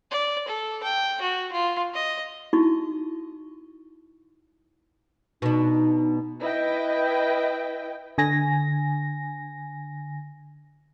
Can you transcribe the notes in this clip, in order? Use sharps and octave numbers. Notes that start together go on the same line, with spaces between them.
D5
A4
G5
F#4
F4
D#5
D#4 E4 F#4 C#6
B2 D4 D#4
E4 B4 D#5 G5
D3 G#5 A#6